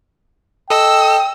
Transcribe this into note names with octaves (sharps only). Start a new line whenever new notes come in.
A4 D#5 G5 E6